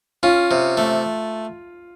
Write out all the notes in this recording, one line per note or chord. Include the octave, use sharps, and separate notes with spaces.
C#4 F4
C3
A3